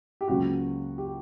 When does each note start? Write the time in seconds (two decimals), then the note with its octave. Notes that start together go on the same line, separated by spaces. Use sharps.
0.21 G4
0.28 C#2 C#3 F#3 A#3 F#4
0.98 G4